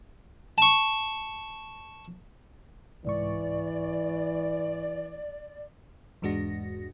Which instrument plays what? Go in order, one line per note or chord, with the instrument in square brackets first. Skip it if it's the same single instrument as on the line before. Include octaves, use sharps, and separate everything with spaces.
[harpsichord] A5 C#6
[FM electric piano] C2 G#2 C#6 [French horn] E3 [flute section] D5
[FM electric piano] E2 G#2 G#3 D4 F#4 A#6